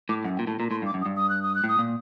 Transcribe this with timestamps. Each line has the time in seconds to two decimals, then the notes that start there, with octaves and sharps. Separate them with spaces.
0.09 A2 D6
0.24 F#2 F#5
0.36 G5
0.39 A#2
0.47 A2 A5
0.59 A#2 A#5
0.71 A2 C6
0.82 G2 D6
0.94 F#2
1.02 D#6
1.06 G2
1.17 D#6
1.30 F#6
1.43 D#6
1.55 F#6
1.64 A2 D#6
1.79 A#2